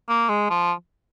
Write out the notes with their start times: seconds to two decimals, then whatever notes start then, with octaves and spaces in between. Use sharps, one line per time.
0.09 A#3
0.29 G#3
0.50 F3